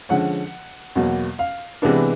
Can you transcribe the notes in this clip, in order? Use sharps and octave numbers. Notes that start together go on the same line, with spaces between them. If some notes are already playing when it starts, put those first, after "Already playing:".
D3 F3 G#3 C#4 F#5
E2 B2 F#3 A#3
F5
C3 E3 G#3 B3 D4